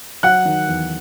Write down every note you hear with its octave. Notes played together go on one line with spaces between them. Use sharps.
F#3 F#5 F#6
D#3
E2